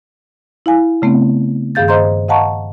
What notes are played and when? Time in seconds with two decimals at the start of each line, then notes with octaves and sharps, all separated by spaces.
0.66 E4 F5 G#5
1.02 C#3 A3 B3 C4
1.75 G2 D#3 G#4 F5 G6 A6
1.88 C5 D#5 A#5 C6 G6
2.29 D#5 F5 F#5 A5 A#5 C#6